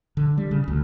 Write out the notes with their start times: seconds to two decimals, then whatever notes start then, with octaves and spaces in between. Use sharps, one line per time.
0.17 D3
0.38 G3
0.51 C#3
0.68 D2